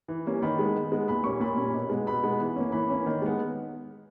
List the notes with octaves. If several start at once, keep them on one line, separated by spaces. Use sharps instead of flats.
E3
G3 A#3 C#4
D#3 B5
G#3 B3
D#3
G#3 B3
A#2 B5
G3 A#3 C#4 C#6
A#2 B5
G3 A#3 C#4
B2
G#3 B3
B2 B5
G#3 B3
E3
A#3 C#4
E3 B5
A#3 C#4
D#3
G#3 B3